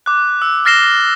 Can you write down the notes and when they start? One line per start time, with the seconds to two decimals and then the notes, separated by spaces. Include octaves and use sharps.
0.06 D6 F#6
0.42 E6
0.65 F6 A6 A#6 C7 E7 G7